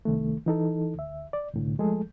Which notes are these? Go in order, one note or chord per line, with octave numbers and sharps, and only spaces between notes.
C2 D#3 A3
E3 D#4 A4
D2 E5
D5
C2 A2 D3
F3 G#3 A3 G#4 A4